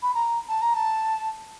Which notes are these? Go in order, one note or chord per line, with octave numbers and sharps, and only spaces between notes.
B5
A#5
A5
A#5
A5